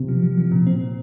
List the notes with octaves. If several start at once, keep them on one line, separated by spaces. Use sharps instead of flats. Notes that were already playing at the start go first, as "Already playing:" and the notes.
Already playing: C3
F3
F3
F3
A#2
C4
A#2